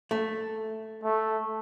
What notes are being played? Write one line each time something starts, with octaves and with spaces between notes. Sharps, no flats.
A3
A3